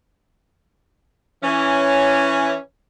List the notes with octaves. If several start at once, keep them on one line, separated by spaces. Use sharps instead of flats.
E3 C#4